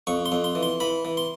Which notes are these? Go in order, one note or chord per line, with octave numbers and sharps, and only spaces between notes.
F2 C#6
C6
F2
C6
E3
C6
E3 B5
E3
C6